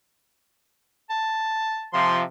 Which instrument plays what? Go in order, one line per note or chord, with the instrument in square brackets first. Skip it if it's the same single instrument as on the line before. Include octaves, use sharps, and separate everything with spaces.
[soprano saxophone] A5
[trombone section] C3 F3 [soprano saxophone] C6